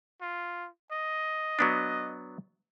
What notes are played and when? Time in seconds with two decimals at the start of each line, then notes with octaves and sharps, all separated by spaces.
0.21 F4
0.91 D#5
1.59 F#3 B3 D4